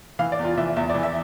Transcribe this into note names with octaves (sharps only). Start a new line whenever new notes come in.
E3 F5
D5
E2
F4
E3 E5
E2 E5
E3 D5
E5